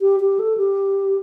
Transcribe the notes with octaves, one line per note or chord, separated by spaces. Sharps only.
G4
G4
A4
G4